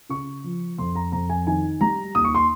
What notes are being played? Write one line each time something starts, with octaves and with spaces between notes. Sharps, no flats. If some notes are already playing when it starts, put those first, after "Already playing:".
C#3 C#6
F3
F2 C6
A#5
F2 A#5
G#5
D#3 G#5
G3 A#5
D#2 D#6
C#6
C6